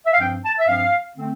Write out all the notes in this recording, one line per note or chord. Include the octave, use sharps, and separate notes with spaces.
E5
F5
G2 F3 C4 G5
A5
E5
G2 F3 C4 F5
D3 A3 C4